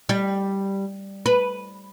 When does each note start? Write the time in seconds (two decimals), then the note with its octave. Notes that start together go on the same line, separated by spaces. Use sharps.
0.09 G3
1.26 B4